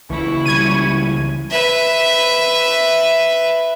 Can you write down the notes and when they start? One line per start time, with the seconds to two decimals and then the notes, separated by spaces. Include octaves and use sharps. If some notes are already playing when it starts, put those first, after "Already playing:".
0.10 C#2 E3 E4 C#6
0.45 C#3 G3 G#6 D#7
1.51 B4 E5